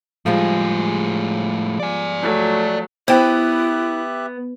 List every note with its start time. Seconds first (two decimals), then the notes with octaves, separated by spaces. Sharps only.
0.26 A2 F3 G3 G#3 G#4
1.80 D5 G#5
2.22 F#3 A3
3.08 B3 E4 G4 C5 E5 G5 F#6